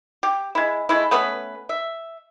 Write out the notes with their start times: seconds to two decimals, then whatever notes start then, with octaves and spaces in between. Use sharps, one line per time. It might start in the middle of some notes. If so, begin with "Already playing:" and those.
0.23 G4
0.55 G#3 E4
0.89 G#3 A3 E4
1.11 A3 B3 C#4 B4
1.69 E5